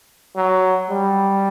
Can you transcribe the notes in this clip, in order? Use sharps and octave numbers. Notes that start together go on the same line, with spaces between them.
F#3
G3